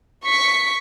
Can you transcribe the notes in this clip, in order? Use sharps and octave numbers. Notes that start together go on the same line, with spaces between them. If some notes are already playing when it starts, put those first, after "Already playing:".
C#6 B6